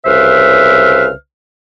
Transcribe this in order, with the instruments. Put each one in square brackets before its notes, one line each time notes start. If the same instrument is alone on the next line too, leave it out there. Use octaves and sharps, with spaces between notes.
[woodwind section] C2 C#3 B4 C5 E5 F6